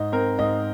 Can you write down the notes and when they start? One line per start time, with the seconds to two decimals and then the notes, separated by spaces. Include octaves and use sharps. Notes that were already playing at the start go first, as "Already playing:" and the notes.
Already playing: G#2 D#5
0.12 C4 A#4
0.39 G#2 D#5